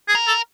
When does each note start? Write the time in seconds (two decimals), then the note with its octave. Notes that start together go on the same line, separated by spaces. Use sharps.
0.08 G#4
0.15 A#4
0.27 A4